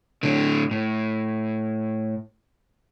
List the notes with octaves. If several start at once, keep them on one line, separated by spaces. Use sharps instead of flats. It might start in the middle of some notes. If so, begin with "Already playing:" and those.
A2 D3
A2